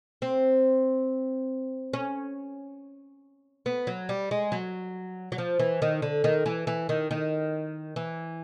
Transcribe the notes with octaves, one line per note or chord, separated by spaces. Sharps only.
C4
C#4
B3
F#3
G3
G#3
F#3
F#3
F3
E3
D#3
D3
D#3
E3
E3
D#3
D#3
E3